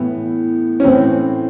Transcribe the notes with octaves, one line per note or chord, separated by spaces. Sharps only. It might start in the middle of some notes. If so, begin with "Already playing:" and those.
Already playing: A2 E3 B3
C#4
A2 E3 C4